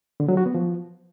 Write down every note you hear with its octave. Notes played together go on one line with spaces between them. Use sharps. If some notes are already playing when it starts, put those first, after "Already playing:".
D3
F#3
F#4
B3
F3